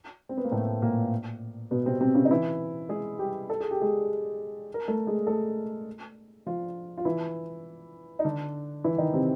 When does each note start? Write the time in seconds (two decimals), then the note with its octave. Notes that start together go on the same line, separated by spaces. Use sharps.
0.29 C4
0.37 B3
0.44 A#3
0.51 A2 A3
0.82 A#2 A#3
1.71 B2 B3
1.86 C3 C4
2.01 C3 C4
2.15 C#3 C#4
2.25 D#4
2.31 E3 E4
2.89 G#3 G#4
3.19 G3 G4
3.50 A4
3.60 G#4
3.71 G4
3.82 G#3 G#4
4.74 A#4
4.88 A3 A4
5.07 G#3 G#4
5.27 A3 A4
6.46 F3 F4
6.98 F4
7.05 E3 E4
8.19 D#4
8.25 D3 D4
8.84 E3 E4
8.98 D#3 D#4
9.13 C3 C4